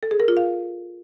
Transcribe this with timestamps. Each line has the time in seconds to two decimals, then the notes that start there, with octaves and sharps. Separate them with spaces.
0.03 A4
0.11 G#4
0.20 A#4
0.28 F4
0.37 F5